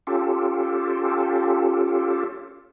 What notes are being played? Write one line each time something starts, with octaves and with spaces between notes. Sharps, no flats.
C#4 F4 G4 A4